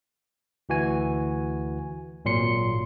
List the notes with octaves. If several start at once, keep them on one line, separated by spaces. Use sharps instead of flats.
D2 E3 F#4 G#5
G#1 A#2 F#3 C6 C#7